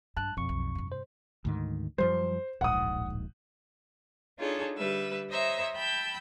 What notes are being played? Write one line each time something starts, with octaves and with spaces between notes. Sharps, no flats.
G2 A5 F#6
F2 B2 C#6
B1
G2 C3
C5
D2 G#2 D#3
F#2 F3 G3 C5
D1 A#1 G#2 F#5 D#6
D4 D#4 F4 G#4 A4 C#5
D3 G3 B4 E5
C5 C#5 D#5 E5 A#5
G5 A5 B5 E6 G6